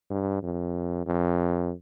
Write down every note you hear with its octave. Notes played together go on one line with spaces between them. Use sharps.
G2
F2
F2